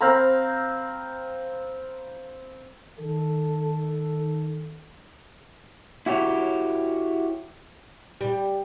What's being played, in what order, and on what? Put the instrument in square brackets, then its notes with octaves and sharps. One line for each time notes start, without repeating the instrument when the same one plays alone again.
[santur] C4 F5 A#5 B5
[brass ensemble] D#3 A4
[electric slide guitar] E4 F#4 G4 C#5
[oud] G3